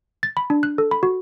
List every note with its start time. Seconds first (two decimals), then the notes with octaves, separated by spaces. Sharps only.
0.23 A6
0.37 B5
0.50 D4
0.63 F#6
0.78 A4
0.91 B5
1.03 F#4